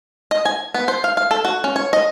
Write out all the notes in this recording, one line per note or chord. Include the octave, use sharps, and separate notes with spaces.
D#5
G#5
B3
C5
F5
F5
A4
F#4
C#4
C#5
D#5